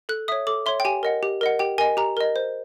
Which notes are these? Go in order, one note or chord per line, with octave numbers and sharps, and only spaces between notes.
A4 F#6
C#5 E5 D#6
A4 D6
C#5 E5 C6
G5
G4 G#5
A#4 D#5 F#5
G4
A#4 D#5 F#5
G4 G5
A#4 D#5 G#5
G4 A#5
A#4 D#5
C5